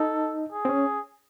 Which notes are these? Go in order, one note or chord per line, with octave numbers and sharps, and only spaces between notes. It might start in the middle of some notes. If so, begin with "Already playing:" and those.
Already playing: D#4 A4
G#4
C4
C#4